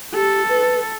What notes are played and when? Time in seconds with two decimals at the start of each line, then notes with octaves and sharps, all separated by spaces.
0.15 G4 A4
0.49 B4